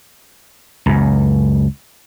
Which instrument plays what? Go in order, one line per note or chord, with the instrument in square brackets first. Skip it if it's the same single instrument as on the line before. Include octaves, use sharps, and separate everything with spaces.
[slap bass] C#2 F#2